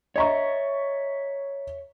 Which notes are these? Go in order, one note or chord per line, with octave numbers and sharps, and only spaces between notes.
C#5 D#5 E5 A#5 C#6